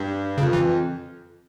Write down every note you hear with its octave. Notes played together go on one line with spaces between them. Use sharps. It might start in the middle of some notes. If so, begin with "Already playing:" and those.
Already playing: G2
F2 C#3
E3